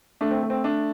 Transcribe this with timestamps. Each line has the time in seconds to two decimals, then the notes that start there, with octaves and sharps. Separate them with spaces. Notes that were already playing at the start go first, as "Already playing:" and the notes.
0.21 A3 D4
0.31 C4
0.43 A3
0.50 C4
0.64 A3 D4